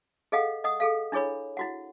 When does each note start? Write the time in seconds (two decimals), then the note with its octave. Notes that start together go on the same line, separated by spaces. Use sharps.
0.32 G#4 A4 D#5 F5 F#5
0.64 D#5 F#5 D#6
0.80 G#4 A4 F5
1.12 D4 E4 G#4 C#5 B5
1.57 E4 F#4 F#5